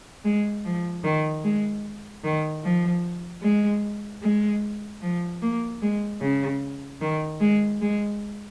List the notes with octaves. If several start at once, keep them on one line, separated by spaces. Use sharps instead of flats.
G#3
F3
D#3
G#3
D#3
F3
G#3
G#3
F3
A#3
G#3
C#3
D#3
G#3
G#3